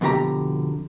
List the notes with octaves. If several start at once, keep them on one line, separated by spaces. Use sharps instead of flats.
F2 B2 D3 F#4 G4 A#5